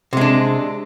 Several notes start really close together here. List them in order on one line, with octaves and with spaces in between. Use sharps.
C3 G#3 D4